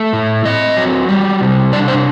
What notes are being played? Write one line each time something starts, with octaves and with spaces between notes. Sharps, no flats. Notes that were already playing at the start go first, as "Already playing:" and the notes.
Already playing: A3
A2
C4 D#5
F#3
G3
C3
D4 D5
C5